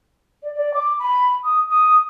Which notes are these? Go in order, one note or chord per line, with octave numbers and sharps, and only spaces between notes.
D5
D5
D6
B5
D#6
D#6